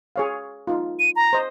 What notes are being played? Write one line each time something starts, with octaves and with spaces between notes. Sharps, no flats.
G#4 C#5 F5
D#4 F4
D#7
A#5
C5 D#5